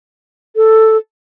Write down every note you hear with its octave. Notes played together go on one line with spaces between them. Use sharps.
A4